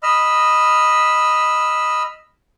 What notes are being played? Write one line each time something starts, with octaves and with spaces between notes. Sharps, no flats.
D#5 B5 E6 F6